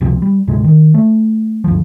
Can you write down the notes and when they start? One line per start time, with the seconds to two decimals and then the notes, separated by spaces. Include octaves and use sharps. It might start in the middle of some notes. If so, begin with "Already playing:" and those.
0.01 C#2 C3 F3 C4
0.22 G3
0.48 D2 G#2 C3 G#3
0.64 D#3
0.94 A3
1.64 G1 D2 F3